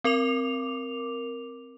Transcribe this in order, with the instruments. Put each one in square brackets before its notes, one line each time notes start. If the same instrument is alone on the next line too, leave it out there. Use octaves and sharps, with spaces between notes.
[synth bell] C4 A#4 D6 F7